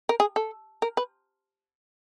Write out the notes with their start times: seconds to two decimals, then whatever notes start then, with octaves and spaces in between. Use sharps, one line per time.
0.09 A#4
0.20 G#4
0.36 A4
0.82 A#4
0.97 B4